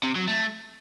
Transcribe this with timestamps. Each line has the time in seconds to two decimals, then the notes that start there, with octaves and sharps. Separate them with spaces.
0.04 C3
0.15 F#3
0.27 A3